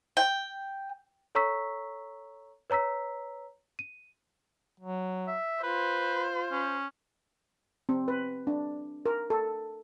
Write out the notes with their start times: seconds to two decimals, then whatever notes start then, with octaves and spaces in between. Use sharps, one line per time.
0.17 G5
1.35 A4 C#5 A#5 C#6 E6 B6
2.70 B4 C#5 A#5 E6 B6
3.79 D#7
4.80 F#3
5.27 E5
5.63 F4 B4 C5
6.52 C#4
7.89 C4
8.08 B4
8.47 D4
9.06 A#4
9.30 A4